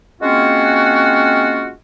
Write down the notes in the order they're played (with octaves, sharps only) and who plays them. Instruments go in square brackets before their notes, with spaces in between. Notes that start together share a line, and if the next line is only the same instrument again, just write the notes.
[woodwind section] G#3 A#3 C4 C#4 F4 F#4